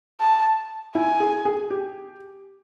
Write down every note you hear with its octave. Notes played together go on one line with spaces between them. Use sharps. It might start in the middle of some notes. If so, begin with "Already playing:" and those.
A5
E4 G#5
G#4
G#4
G4